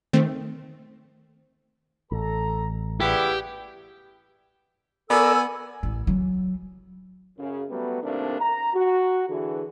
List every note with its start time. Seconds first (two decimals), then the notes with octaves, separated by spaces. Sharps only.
0.13 D#3 A3 C4
2.12 A1 A4 A#5
3.00 C#3 B3 E4 G4 D5
5.10 B3 A4 A#4 D5 G#5 E6
5.83 A1
6.07 F#3
7.38 F#2 C#3
7.70 F#3 G3 A3 B3
8.02 C2 D#3 A3 A#3 C4 D4
8.39 A#5
8.74 F#4
9.28 D3 E3 G#4